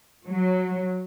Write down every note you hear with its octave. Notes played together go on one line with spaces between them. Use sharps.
F#3